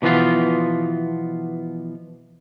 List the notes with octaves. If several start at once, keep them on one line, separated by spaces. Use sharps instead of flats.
B2 E3 F3 B3 F4